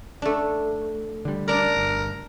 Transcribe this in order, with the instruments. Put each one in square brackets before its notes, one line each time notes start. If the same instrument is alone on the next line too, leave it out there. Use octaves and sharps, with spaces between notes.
[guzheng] A3 D4
[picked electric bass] D3 G3
[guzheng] D4 D5 [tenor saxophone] A#4
[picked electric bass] G1